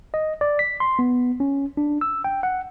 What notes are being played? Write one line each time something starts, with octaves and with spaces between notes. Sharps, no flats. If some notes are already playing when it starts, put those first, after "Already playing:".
D#5
D5
B6
C6
B3
C#4
D4
E6
G5
F#5